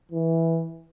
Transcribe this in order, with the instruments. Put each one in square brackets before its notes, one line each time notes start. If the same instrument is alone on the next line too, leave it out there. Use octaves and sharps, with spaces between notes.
[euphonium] E3